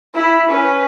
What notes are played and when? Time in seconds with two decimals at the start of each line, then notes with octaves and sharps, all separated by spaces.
0.15 E4 B5
0.49 C#4 B4